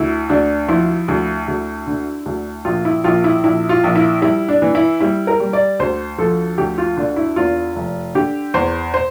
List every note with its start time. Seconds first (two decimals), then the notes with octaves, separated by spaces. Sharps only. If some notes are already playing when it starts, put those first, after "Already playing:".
Already playing: D2 E4
0.29 D2 D4
0.68 F3 E4
1.08 D2
1.48 D2
1.87 D3
2.26 D2
2.65 A#1 F4
2.85 E4
3.04 A#1 F4
3.24 E4
3.44 A#1 E4
3.69 F4
3.84 A#1
3.96 E4
4.22 G3 E4
4.48 D4
4.62 E3
4.75 E4
5.01 G3 E4
5.27 A#4
5.40 G3
5.53 D5
5.79 D2 C5
6.18 F3 A4
6.58 D2 G4
6.78 F4
6.97 D3 D4
7.16 E4
7.36 E2 F4
7.76 F1
8.15 D3 G4
8.54 E2 C5
8.94 C5